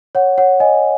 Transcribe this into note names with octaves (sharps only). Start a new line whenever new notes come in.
C#5 F#5
C#5 F#5
D#5 G#5